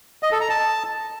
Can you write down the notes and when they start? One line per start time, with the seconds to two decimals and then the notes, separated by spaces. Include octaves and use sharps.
0.23 D#5
0.32 A4
0.41 A#5
0.50 A5